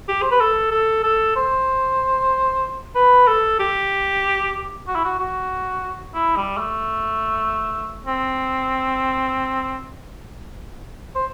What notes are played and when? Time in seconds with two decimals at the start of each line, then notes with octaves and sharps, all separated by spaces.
0.08 G4
0.23 C5
0.31 B4
0.41 A4
0.71 A4
1.03 A4
1.36 C5
2.95 B4
3.27 A4
3.59 G4
4.88 F#4
4.95 E4
5.04 F#4
5.19 F#4
6.14 E4
6.36 G3
6.58 A3
8.07 C4
11.16 C5